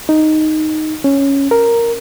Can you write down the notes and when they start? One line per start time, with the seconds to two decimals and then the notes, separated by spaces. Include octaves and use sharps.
0.09 D#4
1.04 C#4
1.51 A#4